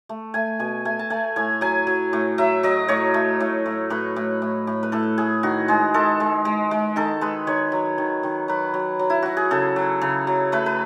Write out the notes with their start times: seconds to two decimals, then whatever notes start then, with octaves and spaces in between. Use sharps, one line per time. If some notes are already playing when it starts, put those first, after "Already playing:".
0.09 A3
0.34 A3 G#5
0.59 B2 G#5
0.85 A3 G#5
0.99 A5
1.10 A3 G#5
1.36 A2 G#5
1.61 F#3 G#5
1.87 F#3
2.13 A2
2.38 F#3 E5
2.63 F#3 D#5
2.88 A2 C#5
3.14 A3
3.40 A2
3.66 A2
3.90 A2 B4
4.16 A2
4.42 A2
4.67 A2
4.83 B4
4.92 A2 A4
5.18 A2 G#4
5.43 D#3 F#4
5.68 G#3 G#4
5.94 G#3 A4
6.20 G#3
6.45 G#3
6.71 G#3
6.96 D#3 A4
7.21 G#3 B4
7.47 D#3 C#5
7.72 F#3
7.98 D#3
8.23 D#3
8.48 F#3 B4
8.74 F#3
8.99 F#3
9.10 E4
9.22 F#3 F#4
9.37 G#4
9.51 C#3 A4
9.76 F#3
10.01 C#3
10.27 F#3
10.52 A3 B4
10.66 B4